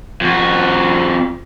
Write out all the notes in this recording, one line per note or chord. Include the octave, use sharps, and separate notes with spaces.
F2 F#4